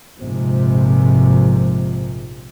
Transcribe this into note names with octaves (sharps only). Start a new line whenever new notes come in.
A#1 G#2 C3